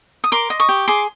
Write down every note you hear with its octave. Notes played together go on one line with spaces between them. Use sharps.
D#6
A#4 C6 D6
D#5
C#6 D#6
G4
G#4 C6 D6